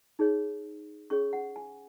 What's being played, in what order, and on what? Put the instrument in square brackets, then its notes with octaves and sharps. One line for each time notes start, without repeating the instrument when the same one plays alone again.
[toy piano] D#4 G#4 C#5
C#4 G#4 C#5 C#6
F#5
G#5